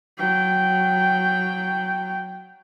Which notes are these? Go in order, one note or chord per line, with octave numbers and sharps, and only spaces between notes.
F#3 G5